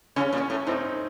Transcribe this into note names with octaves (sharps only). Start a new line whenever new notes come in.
C#3 C#4
A#2
C#4
A2
A2 C4 D#4